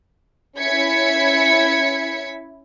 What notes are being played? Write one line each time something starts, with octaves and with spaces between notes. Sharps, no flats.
C#4 E4 G#6 B6 C#7